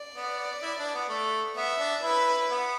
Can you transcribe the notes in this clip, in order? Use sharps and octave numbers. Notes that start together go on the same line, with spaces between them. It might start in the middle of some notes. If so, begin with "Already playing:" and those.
Already playing: D5
B3
E4
D4
B3
A3
B3 E5
D4
E4 B4
B3